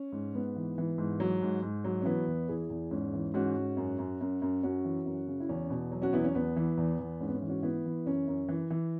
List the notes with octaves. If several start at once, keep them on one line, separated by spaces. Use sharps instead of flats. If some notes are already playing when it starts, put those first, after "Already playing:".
Already playing: C#4
G#2
G#2 B3
E3
E3
G#2
F#3
G#2
G#2
F#3
C#4
E3 B3 E4
E2
E2 E4 G#4
E2
G#2 C#4
E3
G#2 C#4 F#4
G#2
F#2
F#2
F#2
F#2
F#2 C#4 F#4
E3
F#2
C#3
E4
E2 C#4
B2
F#3
C#4 F#4
E2 B3 E4
C#4
E2 B3
E3
E2
E2
G#2 C#4
B3
C#4
E3
C#4 F#4
E3 B3 E4
E3
F#2 C#4
F#2
E3
E3